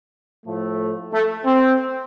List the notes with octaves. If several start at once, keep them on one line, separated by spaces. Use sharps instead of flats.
A2 F3 A3
A3
C4